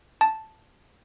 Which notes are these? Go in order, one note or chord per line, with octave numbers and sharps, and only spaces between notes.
A5